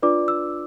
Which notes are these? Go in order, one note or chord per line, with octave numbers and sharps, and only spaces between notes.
D4 F4 B4 D5 D6
E6